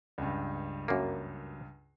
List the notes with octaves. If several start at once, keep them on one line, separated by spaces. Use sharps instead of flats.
C#2 G2
F#2 A#3